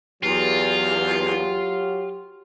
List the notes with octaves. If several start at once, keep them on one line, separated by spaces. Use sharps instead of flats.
E2 F#3 F4 G4